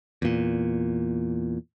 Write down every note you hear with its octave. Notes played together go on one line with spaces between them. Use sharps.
E2 A#2